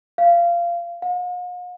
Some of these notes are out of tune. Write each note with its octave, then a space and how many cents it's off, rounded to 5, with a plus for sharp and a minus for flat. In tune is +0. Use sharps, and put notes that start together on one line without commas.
F5 -20
F5 +45